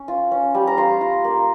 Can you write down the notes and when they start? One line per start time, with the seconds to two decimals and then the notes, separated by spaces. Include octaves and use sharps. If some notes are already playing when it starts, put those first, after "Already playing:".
Already playing: C#4
0.08 F4
0.31 C#4
0.54 G3
0.67 A#5
0.78 F4 C6
1.01 F4
1.25 A#3